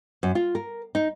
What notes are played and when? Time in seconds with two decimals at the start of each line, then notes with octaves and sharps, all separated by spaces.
0.23 F#2
0.35 F4
0.55 A#4
0.95 D#4